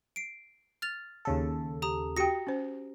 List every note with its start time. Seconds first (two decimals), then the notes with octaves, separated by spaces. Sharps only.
0.16 C7 D7
0.82 F6 A6 F7
1.25 D#2 C#3 A4
1.82 G4 A#5 D#6
2.17 F#4 G4 G5 A#6 C#7
2.47 C#4 C5